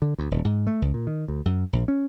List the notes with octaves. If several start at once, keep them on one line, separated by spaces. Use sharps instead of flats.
D3
D2
D#1
G#2
A3
C#2
A#2
D#3
D2
F#2
A#1
C#4